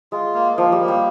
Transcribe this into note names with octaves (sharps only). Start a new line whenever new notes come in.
G#3 F4
A#3
F3 A#3
G3
A#3
G3